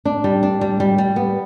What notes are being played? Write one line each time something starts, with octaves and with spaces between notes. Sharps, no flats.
D4
G3
D4
G3
G3
G3
B3